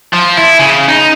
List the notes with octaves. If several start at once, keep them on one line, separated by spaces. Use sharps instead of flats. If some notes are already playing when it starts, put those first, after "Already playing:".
F3
E4
C#3
D#4